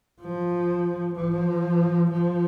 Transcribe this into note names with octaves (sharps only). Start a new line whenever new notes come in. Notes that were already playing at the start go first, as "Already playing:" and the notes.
F3
F3
F3